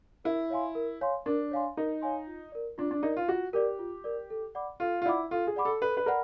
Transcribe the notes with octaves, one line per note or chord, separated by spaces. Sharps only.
E4 A#4
C#5 F5 G#5 C6
A#4
C#5 F5 G#5 C6
D4 A#4
C#5 F5 G#5 C6
D#4 A#4
C#5 F5 G#5 C6
F4
A#4 D5
D4 F4
D4
D#4 A#4 D5
F4
F4 F#4
G4 A#4 D5
F4
A#4 D5
A4
D5 F#5 B5 D6
F4 A4
F4
E4 D5 F#5 B5 D6
F4 A4
G#4
D5 F#5 B5 D6
A4
A4 B4
B4
A#4 D5 F#5 B5